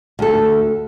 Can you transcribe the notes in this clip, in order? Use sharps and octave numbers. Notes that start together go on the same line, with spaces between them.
D2 A4